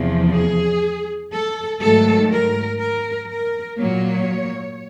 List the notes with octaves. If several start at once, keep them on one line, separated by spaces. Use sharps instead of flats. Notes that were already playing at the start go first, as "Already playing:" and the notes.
Already playing: E2 C3 F3
G#4
A4
G#2 D#3 F#3 A3 A4
A#4
A#4
A#4
A#2 F#3 A#3 C#5